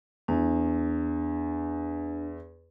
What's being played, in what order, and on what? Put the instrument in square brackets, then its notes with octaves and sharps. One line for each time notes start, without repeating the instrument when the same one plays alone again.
[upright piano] E2 [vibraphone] D4